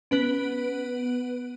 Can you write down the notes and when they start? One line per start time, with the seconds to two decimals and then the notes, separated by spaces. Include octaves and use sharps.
0.11 B3 C#4 B4 D7